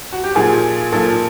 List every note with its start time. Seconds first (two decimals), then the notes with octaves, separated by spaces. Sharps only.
0.13 F#4
0.24 G4
0.35 A#2 F3 G#4
0.92 A#2 F3 A4